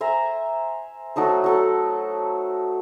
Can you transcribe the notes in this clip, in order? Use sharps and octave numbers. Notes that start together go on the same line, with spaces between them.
C5 E5 G#5 A#5
F#3 A3 D#4 C5
F#3 A4 F#5